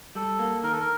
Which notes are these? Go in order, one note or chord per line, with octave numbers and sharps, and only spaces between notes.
G3 A4
A#3
D#3 A#4
A4
A#4